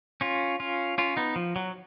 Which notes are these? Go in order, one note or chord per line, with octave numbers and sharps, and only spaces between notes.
C#4 F4
C#4 F4
C#4 F4
B3 D#4
F3
F#3